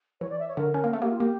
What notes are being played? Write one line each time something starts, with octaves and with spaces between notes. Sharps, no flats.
E3 C#5
D5
E5
C#5
D3 A#4
C#4 A#4
A#3
A3 A4
A#3 G4
F4
A#3 G4